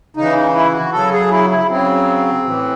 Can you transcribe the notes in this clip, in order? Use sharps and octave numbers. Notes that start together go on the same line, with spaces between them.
C#3 E3 D#4
E4
F#4
C#3 F#3 A4
G#4
E4
E4
C#3 F#3 C4
A2 E3